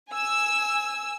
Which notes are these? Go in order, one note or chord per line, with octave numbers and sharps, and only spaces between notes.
G#5 E6